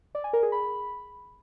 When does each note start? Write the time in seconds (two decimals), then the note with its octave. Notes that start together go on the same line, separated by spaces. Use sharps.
0.15 D5
0.24 G#5
0.33 A#4
0.43 G#4
0.52 B5